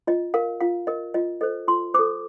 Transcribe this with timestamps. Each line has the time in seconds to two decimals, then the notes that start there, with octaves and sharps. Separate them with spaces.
0.07 F4 D#5
0.34 A#4 F5
0.61 F4 F5
0.87 A#4 D#5
1.14 F4 D#5
1.41 A4 C5 D#5
1.68 F4 C6
1.94 A4 C5 D6